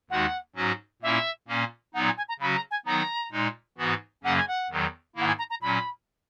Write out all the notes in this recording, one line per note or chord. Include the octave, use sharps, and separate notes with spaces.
D#2 D#3 G#3 D#4 F#4 F#5
G#2 F#3 C#4 F#4
A#2 A#3 C#4 E4 E5
A#2 A#3 C#4
A#2 F#3 B3 D#4 F#5
G#5
G#5
A#5
C#3 F#3 C#4 F#4 B5
A#5
G#5
D#3 F#3 B3 D#4 A#5
A#2 G#3 D#4
G#2 E3 B3 F#4
F#2 C#3 F#3 A#3 C#4 F#5
G#5
F#5
E2 D#3 F#3
G#2 D#3 A#3 E4 F#5
G#5
A#5
A#5
A#2 F#3 C#4 B5